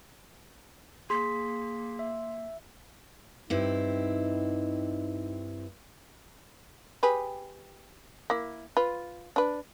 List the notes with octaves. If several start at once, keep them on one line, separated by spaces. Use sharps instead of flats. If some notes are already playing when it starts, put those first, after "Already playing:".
A#3 G#4 C6 B6
E5
G2 C4 D#4 E4
G4 G#4 B4
A#3 E4
F4 B4
D4 B4